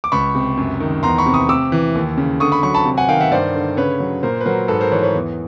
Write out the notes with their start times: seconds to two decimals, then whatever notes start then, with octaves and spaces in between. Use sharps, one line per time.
0.04 D6
0.12 C#2 B5 C#6
0.35 C3
0.57 F#2
0.80 D#3
1.03 E2 A#5 C6
1.18 B5 C#6
1.26 C3
1.34 C#6 D#6
1.49 C3 D6 E6
1.72 E3
1.95 D#2
2.17 C#3
2.40 D3 C#6 D#6
2.52 B5 C#6
2.63 F#3 B5 C#6
2.74 A5 B5
2.86 C3
2.97 F#5 G#5
3.09 D#3 F5 G5
3.20 E5 F#5
3.31 G2 C5 D5
3.54 D3
3.77 C#3 B4 C#5
4.00 F#3
4.23 A#2 A#4 C5
4.41 B4
4.45 F#3 A#4 C5
4.68 G#2 A4 B4
4.80 A#4 C5
4.91 E3 B4 C#5
5.02 B4 C#5
5.14 E2